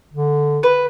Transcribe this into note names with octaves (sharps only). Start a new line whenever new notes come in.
D3
B4